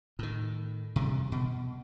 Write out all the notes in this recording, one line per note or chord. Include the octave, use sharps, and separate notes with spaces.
A2 D#3
C3 E3 G3
B2